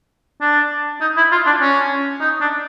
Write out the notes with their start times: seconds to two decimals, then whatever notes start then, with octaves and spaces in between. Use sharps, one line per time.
0.41 D4
1.01 D#4
1.17 E4
1.31 F4
1.46 D4
1.61 C#4
2.21 D#4
2.40 D4